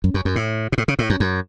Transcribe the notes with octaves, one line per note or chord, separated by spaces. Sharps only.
F#2
F#2
F#2
A2
B2
A2
C#3
A2
F#2
F#2